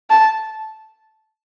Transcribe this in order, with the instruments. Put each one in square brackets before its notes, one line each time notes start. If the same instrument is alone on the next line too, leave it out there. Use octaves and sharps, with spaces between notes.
[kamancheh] A5